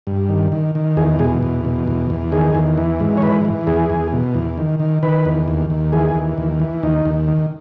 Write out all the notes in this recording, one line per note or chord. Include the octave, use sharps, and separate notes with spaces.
G2
D#3
D#3
D#3
E2 G#4
B2 G#4
E2
B2
E2
E2
D#3 G#4
E2
E3
G#2
C#5
E3 B4
E3
E2 G#4
E2
B2
E2
D#3
D#3
D#3 B4
E2
D#2
D#2
E3 G#4
D#2
D#2
E3
D#2 D#4
D#2
D#3